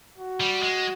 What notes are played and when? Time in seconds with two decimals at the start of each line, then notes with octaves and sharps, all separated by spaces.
0.18 F#4
0.40 G3
0.63 G#3